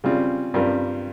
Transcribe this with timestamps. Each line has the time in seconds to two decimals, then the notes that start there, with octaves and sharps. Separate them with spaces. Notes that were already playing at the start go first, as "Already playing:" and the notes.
0.04 C#3 G3 C4 F4
0.54 G2 G3 C4 F4 A#4